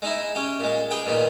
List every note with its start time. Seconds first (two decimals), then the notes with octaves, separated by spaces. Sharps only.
0.02 G#3 D#4 E4
0.35 C#4 G4
0.60 A#2 G#3
0.90 G4 G#4 B4 G5
1.06 G2 A#2 D#3